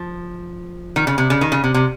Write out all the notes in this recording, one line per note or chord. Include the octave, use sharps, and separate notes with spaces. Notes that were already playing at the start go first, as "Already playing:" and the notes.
Already playing: F3
D#3
C#3
C3
C#3
D#3
C#3
C3
C3